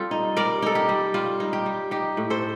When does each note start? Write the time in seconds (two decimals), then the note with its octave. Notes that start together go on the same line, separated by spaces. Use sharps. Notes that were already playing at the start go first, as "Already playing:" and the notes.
Already playing: G3 C4 F4 G4 A4
0.11 D#4
0.36 G3 A#4 D5
0.62 D#4 A4
0.75 G4
0.89 G3
1.14 G3 F4
1.40 D#4
1.53 G4
1.66 G3
1.91 D#4 G4
2.17 A2
2.30 A4 C5